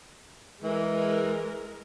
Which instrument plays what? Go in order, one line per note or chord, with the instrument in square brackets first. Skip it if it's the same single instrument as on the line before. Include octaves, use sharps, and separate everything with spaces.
[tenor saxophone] E3 [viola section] G#3 A#4